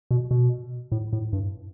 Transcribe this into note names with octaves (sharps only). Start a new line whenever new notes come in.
B2
B2
A2
A2
G2